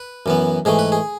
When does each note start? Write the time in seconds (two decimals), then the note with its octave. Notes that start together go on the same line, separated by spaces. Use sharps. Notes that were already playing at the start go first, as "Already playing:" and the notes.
Already playing: B4
0.26 F#2 E3 B3
0.65 G#2 E3 A3 G#4
0.79 B4
0.92 G#4